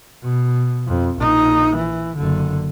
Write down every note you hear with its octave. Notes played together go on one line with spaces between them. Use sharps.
B2
F2
A#1 D#4
E3
F#1 D3